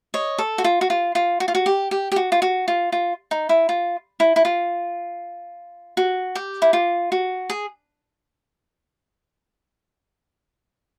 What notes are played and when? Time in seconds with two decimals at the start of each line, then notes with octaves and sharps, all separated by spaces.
0.14 C#5 D#5
0.39 A4
0.58 F#4
0.64 F4
0.81 F#4
0.90 F4
1.15 F4
1.40 F#4
1.48 F4
1.55 F#4
1.66 G4
1.91 G4
2.12 G4
2.16 F#4
2.32 F4
2.42 F#4
2.68 F4
2.92 F4
3.31 D#4
3.49 E4
3.69 F4
4.20 E4
4.36 E4
4.45 F4
5.97 F#4
6.35 G4
6.62 E4
6.73 F4
7.12 F#4
7.50 G#4